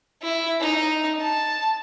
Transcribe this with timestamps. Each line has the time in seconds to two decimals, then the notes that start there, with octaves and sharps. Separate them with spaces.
0.22 E4
0.61 D#4
1.22 A5